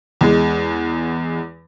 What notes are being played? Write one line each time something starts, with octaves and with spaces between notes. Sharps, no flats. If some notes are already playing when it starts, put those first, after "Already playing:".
E2 G#3